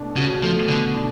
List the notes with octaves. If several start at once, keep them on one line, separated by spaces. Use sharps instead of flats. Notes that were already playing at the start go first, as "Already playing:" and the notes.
Already playing: B2 A3 D4
C#3 F#4
F3 A3
B2 D3
D4